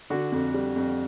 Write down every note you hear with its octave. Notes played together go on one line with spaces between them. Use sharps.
D3 F#4
F2
G3
F2